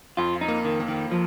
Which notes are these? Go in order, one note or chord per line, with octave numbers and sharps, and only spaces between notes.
F2 F4
D#4
A#3
D#3
A#3
D#3
F3